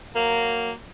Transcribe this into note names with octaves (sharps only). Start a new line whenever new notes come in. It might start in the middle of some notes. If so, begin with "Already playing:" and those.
F#3 A#3